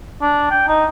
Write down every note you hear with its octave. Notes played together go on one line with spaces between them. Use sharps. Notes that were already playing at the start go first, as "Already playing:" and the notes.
D4
G5
D#4